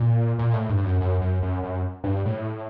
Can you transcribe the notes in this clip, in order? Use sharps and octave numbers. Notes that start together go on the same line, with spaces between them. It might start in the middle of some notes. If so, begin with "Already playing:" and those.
Already playing: A#2
A#2
A2
G2
F#2
F#2
F#2
F#2
F#2
G2
A2